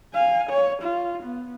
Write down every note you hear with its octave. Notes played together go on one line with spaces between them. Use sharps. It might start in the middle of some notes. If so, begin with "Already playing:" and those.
F5 G#5
C#5
F4
B3